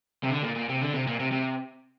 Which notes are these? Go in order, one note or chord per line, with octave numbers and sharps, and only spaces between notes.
C3
D3
A#2
A#2
C3
D3
C3
A#2
C3
C3